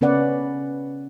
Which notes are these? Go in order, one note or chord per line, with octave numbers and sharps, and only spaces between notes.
C#3 B3 C#4 B4 D5 F#5